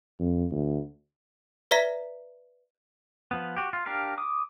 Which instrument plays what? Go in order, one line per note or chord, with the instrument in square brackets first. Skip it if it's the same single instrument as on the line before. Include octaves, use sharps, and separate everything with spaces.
[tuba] F2
D2
[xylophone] B4 D5 E5 A#5 B6
[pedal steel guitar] F3 B3
F#4 G4
F4
D4 G4 A#4 F5
D6 D#6